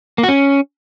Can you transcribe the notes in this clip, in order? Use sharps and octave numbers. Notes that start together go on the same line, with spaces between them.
A#3
F#4
C#4